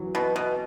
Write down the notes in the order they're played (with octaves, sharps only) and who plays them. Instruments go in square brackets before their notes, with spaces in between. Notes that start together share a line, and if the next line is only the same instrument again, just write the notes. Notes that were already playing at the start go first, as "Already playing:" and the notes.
Already playing: [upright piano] E3 F#3
[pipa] B2
B2